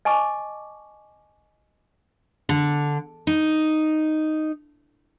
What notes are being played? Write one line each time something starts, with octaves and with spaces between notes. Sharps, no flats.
D#5 G#5 A5 C#6 D6
D3
D#4